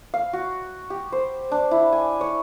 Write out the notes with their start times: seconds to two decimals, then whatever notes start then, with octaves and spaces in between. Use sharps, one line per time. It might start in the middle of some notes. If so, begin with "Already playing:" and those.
0.14 F5
0.33 F#4
0.90 G4
1.12 C5
1.52 D4
1.71 E4
1.92 G#5
2.21 C#5